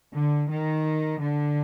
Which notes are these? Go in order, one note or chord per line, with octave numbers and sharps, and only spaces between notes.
D3
D#3
D3